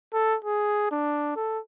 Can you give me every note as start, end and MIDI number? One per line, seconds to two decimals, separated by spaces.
0.13 0.37 69
0.45 0.87 68
0.91 1.34 62
1.36 1.59 69